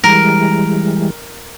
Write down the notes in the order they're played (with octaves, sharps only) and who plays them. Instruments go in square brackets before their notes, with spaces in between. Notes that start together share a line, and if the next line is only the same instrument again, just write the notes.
[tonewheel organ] E3 G3 G#3 [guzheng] A#4